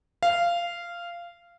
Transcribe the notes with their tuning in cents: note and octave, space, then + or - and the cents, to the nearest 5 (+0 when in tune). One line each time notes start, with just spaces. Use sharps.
F5 -15